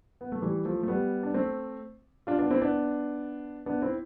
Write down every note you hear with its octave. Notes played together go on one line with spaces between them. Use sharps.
B3
A3
E3 G3
F3 A3
A3
G3 B3
D4
A3 C4
D4 F4
B3 D4
C4 E4
B3 D4
B3 D4
C4 E4